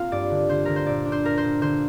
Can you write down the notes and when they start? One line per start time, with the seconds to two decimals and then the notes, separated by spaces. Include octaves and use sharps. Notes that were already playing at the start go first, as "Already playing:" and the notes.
Already playing: A#3 C4 F4 F5
0.12 G2 D5
0.30 D3
0.49 D3 C5
0.65 D3 A#4
0.76 C5
0.86 A#2 D5
1.06 D4
1.12 C5
1.24 A#3 A#4
1.38 C5
1.44 A#2
1.61 D3 C5